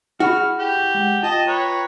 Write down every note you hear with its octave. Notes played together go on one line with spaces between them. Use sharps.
E4 F#4 G#4 B5 F6
G4
G#3 F#5
F4 D#5 G5 A5
B4 C#5 A#5